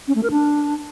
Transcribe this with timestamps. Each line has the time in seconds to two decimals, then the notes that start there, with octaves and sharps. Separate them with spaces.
0.08 C#4
0.15 A3
0.23 A#4
0.31 D4